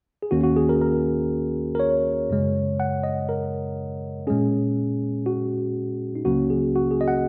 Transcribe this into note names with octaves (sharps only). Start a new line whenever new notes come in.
G#4
D#2 D#3 A#3 C#4 F#4
F#4
G#4
A#4
A#4
A#4
C#5
F#2 C#3 G#3
F#5
D#5
A#4
A#2 G#3 C#4 G#4
F#4
D#4
C#2 C#3 F#3 A#3 C#4 F#4
G#4
F#4
G#4
D#5
F#5